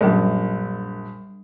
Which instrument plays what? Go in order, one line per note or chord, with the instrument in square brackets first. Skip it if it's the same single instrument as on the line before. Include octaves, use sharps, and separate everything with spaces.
[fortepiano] A#1 F#2 [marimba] G3 D4